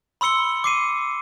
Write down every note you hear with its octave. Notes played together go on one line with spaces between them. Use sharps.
B5 C6 E6 C#7 G7
D6 C7 D#7